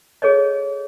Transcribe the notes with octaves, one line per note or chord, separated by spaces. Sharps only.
G#4 A4 C#5 D#5